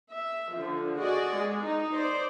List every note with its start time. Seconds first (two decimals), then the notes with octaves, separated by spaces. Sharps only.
0.12 E5
0.55 D3 F3
0.99 F#4 G#4 D5 D#5
1.35 G#3
1.63 D#4
1.94 C5 D5